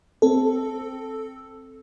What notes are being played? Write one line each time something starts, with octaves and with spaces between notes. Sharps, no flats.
C4 A4